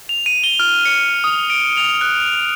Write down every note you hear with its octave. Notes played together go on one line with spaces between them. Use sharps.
F7
D#7
G7
F6
C#7
D#6
D7
F7
F#6